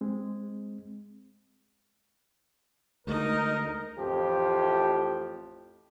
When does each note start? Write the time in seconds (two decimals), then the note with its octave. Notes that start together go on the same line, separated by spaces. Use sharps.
0.01 G#3 C4
3.07 D2 G#3 A3 D#4 A#4 D#5
3.99 A1 F2 A2 F3 G4